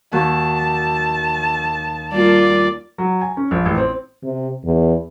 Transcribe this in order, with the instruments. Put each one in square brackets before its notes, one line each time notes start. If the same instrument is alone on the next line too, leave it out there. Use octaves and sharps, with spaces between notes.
[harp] D#2 F#4 [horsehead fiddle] A5
[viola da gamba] G3 A#3 F4 [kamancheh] D5
[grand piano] F#3
G#5
C#4
A#1
A1
C4
[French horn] C3
E2